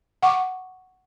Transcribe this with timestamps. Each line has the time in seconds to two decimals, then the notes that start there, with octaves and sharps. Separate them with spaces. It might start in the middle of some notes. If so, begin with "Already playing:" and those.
0.22 F#5 C#6 D6